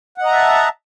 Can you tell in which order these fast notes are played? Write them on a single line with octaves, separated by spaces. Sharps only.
F#5 D#5 A#5 E5 A5